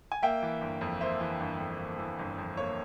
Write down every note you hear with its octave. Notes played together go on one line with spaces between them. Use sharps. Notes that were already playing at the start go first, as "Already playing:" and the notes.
G#5
A#3 E5 G5
E3
G1
F2
A#3 C5 E5
E3
G1
F2
A#3
E3
G1
F2
A#3 C#5